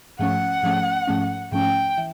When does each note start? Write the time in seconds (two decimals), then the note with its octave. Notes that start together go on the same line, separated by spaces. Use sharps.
0.19 G#2 F3 A3 C#4 F#5
0.63 G#2 F3 A3 C#4
1.07 G#2 F3 A3 C#4
1.52 G#2 F3 A3 C#4 G5
1.97 E3